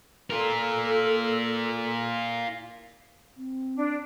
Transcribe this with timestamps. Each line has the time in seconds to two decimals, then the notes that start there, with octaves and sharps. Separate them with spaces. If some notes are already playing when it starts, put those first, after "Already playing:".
0.30 F4 A4 A#4
3.37 C4
3.75 D4